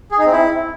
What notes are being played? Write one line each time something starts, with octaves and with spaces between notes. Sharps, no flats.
G#4
D#4
C4
E4